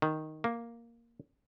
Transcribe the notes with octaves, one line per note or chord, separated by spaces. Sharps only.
D#3
A#3